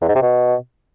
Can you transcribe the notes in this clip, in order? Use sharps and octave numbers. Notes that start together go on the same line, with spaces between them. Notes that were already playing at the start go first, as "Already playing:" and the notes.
E2
G#2
C3
B2